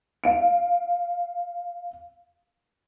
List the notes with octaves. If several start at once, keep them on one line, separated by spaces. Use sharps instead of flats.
F5 D7